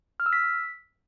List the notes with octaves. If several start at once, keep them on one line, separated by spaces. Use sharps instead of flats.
F6
E6
B6